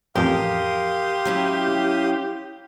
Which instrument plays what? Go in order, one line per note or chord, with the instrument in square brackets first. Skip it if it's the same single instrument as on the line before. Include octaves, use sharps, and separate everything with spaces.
[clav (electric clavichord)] A1 F2 [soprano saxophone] G4 [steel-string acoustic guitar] A#4 [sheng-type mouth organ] F5 C6 D#6
[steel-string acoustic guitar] F#3 C#4 E4